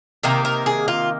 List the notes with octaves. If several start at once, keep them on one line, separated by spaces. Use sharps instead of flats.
C3 D#3 A#3 A#4
A#4
G#4
F4